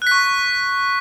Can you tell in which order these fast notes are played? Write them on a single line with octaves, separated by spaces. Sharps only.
F#6 B6 C#6